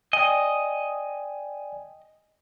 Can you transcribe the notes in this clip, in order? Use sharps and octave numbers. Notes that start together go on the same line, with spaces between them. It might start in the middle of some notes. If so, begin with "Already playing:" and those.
D5 D#5 G5 G#5